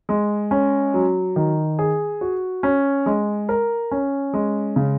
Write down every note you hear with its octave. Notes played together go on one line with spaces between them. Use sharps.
G#3
C#4
F#3
D#3
G#4
F#4
C#4
G#3
A#4
C#4
G#3
C#3